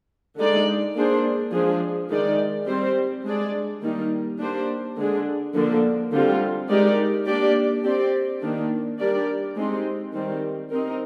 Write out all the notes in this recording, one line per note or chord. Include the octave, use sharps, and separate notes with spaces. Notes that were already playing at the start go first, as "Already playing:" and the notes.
D3 G#3 D#4 G#4 D5
A#3 D4 G#4 C5
F3 G#3 D4 G#4
D#3 G#3 D#4 G#4 D5
G3 C4 G4 C5
G#3 D4 G#4 D5
D#3 G3 A#3 D#4
A#3 D4 G4 C5
D3 G#3 D4 G#4
D3 F3 A#3 D4
D3 G3 C4 F4
G#3 D#4 G4 A#4 D5
A#3 D4 G4 D5
C4 G4 D5
D#3 A#3 D4
G3 D4 G4 A#4 D5
G#3 C4 D#4 G4
D#3 G3 C4
C4 D#4 A#4